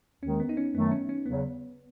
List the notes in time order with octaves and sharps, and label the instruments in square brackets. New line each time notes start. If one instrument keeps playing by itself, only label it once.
[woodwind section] D#2 D#3 G#3 [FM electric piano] C#4
[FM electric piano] B3
D#4
C#4
[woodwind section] F#2 D#3 F#3 A3 [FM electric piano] B3
[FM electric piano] C#4
C#4
[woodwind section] E2 C#3 F#3 [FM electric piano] B3